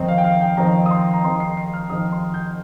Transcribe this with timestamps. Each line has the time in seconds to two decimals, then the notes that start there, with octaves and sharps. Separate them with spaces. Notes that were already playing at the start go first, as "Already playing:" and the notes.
Already playing: F2 D#3 C4 D#4
0.08 F5
0.18 G5
0.24 F5
0.41 G5
0.57 F2 D#3 C4 D#4 A#5
0.86 D#6
0.90 C6
1.13 A#5
1.24 F2 D#3 C4 D#4 C6
1.40 C7
1.57 C7
1.74 F6
1.90 F2 D#3 C4 D#4 D#6
2.12 C6
2.34 G6